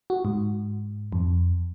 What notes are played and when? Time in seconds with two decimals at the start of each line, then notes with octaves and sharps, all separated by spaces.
0.10 F#4
0.25 G#2
1.13 F2